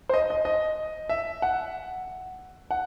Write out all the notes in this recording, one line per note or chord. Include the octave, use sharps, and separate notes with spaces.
C5
D#5
D#5
D#5
E5
F#5
F#5